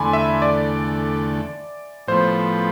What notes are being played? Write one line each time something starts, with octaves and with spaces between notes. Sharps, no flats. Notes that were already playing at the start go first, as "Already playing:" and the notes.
Already playing: E2 D3 A3 G#5 B5 C6 D6
E5
D5
A2 F3 B3 C5